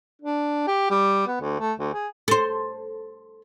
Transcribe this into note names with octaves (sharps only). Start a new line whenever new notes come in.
D4
G4
G3
B3
D2
A3
D2
G#4
A4 C5